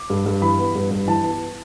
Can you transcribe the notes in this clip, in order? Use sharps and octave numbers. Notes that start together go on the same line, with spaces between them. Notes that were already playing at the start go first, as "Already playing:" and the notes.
Already playing: D6
G2
G2
E3 B5
B3
G2
G2
E3 A5
B3